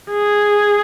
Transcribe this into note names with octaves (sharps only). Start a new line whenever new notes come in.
G#4